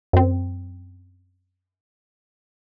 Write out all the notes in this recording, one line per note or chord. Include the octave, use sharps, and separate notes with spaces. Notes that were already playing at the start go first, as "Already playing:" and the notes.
F#2 C4